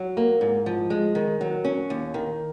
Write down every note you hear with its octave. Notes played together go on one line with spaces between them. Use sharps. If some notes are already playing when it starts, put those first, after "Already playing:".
Already playing: F#3
A#3
G#2
F3
G#3
D#3
F#3
C#4
D#2
D#3